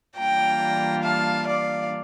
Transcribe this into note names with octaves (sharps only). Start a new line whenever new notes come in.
E3 G3 A#3 D4 F4 G5 A#5
F5 A5
D5 F5